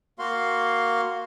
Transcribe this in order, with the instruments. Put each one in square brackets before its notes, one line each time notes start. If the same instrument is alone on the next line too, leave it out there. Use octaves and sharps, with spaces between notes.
[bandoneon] A#3 F#4 F5 C6